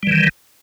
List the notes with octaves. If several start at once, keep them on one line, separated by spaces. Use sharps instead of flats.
D#3 E3 G3